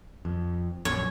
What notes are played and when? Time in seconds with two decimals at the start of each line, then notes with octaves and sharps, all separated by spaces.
0.25 F2
0.85 A#1 F#2 C#5